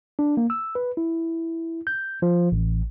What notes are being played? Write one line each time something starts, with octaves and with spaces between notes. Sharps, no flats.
D4
A#3
E6
B4
E4
G6
F3
A1